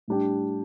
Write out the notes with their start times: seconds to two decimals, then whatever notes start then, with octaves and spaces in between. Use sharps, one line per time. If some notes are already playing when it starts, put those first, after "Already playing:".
0.08 A2 G3 D4 G4